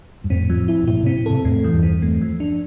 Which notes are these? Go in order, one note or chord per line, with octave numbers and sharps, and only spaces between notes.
G2
F2 A2 C4
F3
E4
A2
G2 A#2 E4
A2 C3
C4
A2 C3 A4
F2 A2 A3
E3
E2 G2
C4
A3
F3
D4